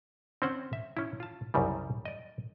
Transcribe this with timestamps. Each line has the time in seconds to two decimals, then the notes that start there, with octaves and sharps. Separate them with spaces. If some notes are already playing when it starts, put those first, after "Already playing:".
0.42 C4 C#4 C5 F#5
0.73 E5
0.97 C#4 E4
1.20 F4 A5
1.54 C2 F#2 C#3 G3
2.05 D5 D#5